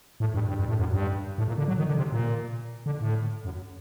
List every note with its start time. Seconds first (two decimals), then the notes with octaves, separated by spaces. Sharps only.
0.20 A2
0.34 G2
0.49 G2
0.60 G2
0.69 A2
0.79 F#2
0.94 G2
1.38 A2
1.48 A#2
1.58 D3
1.68 F#3
1.78 D#3
1.88 D3
1.98 C3
2.12 A#2
2.86 D3
3.01 A2
3.45 F#2